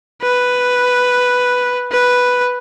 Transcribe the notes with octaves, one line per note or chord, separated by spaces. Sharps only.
B4
B4